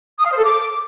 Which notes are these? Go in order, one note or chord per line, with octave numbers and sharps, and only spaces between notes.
D#6
F5
C5
A4
D6